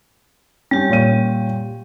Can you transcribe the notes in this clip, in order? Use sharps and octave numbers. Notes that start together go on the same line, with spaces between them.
G3 C#4 G4
A#2 C#5 D#7